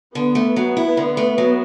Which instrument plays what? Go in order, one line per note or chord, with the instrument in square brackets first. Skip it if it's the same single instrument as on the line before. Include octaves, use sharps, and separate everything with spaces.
[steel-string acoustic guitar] D3 [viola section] B3
[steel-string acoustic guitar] A3
F#3
E4
D3
A3
F#3